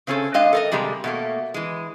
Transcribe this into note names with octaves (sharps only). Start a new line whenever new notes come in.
C#3 C4 C#4 G#4 A4
G#3 D4 D#5 F5 G5
A4 A#4 D#5
C3 G3 G#3 G4 A#5
B2 A3 A#3
E3 G#3